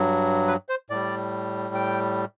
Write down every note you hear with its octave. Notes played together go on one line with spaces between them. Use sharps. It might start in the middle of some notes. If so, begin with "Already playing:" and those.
Already playing: G2 F#3
B4
C5
A2 G3 D5
G5